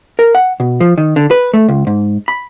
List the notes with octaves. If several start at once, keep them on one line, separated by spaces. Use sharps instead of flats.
A#4
F#5
B2
F3
D#3
D3
B4
A3
C#2
G#2
B5